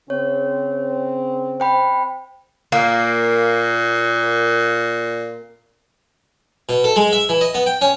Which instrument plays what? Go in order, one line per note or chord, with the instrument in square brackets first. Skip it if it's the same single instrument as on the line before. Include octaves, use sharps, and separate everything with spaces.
[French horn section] C#3 C4 [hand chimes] C#5
[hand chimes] C5 G5 B5
[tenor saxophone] A#2 [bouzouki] A#3
[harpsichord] B2
A4
G#3
E5
E3
D#5
B3
G5
C#4